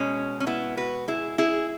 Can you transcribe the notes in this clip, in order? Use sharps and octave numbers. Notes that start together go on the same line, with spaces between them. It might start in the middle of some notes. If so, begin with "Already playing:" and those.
Already playing: B2 G#3 C#4
C#4
B3 E4
F#4 B4
E4 G#4
E4 G#4